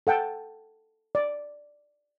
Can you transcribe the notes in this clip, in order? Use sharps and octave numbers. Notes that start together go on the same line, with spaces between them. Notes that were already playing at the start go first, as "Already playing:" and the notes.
A4 F#5 G5 A5
D5